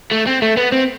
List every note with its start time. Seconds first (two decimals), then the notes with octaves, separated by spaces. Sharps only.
0.12 A3
0.27 C4
0.42 A3
0.57 B3
0.72 C4